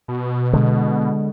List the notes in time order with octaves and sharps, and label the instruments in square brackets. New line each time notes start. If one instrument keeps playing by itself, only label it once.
[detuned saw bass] B2
[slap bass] D3 G#3